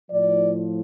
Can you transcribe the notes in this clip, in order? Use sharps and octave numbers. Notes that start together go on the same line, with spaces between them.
A2 F3 D5